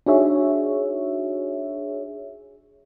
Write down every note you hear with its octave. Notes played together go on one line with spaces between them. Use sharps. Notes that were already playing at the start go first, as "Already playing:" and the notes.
D4 D#4 F#4 G#4 C#5 E5